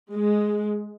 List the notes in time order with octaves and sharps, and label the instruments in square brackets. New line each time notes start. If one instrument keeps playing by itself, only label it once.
[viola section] G#3